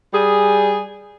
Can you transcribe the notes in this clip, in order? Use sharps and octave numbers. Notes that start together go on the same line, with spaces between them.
G3 G#4